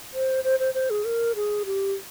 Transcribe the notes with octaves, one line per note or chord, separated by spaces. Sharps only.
C5
C5
C5
C5
G#4
A#4
G#4
G4